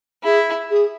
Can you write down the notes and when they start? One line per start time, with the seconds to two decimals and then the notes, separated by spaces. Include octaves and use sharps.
0.24 E4 G#4
0.70 G#4